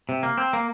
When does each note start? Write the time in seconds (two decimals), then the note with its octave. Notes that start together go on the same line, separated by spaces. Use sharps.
0.09 C3
0.23 A#3
0.38 C4
0.53 A#3